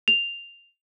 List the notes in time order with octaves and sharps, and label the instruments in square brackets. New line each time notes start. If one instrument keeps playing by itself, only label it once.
[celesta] F7